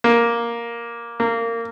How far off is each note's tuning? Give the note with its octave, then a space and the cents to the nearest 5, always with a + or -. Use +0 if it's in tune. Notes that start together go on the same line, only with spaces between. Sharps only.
A#3 +5
A#3 -20